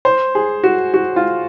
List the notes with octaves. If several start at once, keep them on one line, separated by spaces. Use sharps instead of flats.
C5
G#4
F#4
F#4
F4